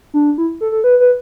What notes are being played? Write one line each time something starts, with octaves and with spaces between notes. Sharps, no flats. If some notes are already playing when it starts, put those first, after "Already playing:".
D4
E4
A4
A4
B4
B4